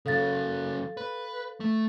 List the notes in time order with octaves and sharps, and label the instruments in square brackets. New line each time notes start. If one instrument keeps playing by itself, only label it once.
[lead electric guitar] C#3 F#3 [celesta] A4 F5 A6
[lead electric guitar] B4
A3